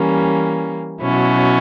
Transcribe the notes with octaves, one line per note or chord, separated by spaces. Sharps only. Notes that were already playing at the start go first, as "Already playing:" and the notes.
Already playing: E3 G3 A#3 C#4
B2 F#3 C#4 E4